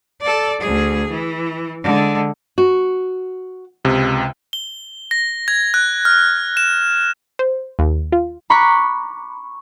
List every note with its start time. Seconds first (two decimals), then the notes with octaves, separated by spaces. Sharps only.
0.21 A4 D5
0.61 D2 G#4
1.10 E3
1.83 D3 G#3
2.58 F#4
3.85 C#2 C3
4.53 G7
5.11 A#6
5.48 G#6
5.74 F#6
6.05 F6
6.57 E7
7.39 C5
7.79 D#2
8.12 F4
8.50 A#5 B5 C#6 D6 F#6 B6